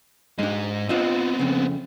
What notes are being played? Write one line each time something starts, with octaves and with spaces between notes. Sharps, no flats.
G#2 G#3 D4 D#5
B3 C4 D4 F4 D#5
F2 C#3